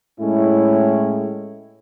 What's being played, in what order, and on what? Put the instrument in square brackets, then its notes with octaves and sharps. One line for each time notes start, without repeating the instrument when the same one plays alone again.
[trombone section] A2 G#3 C#4 E4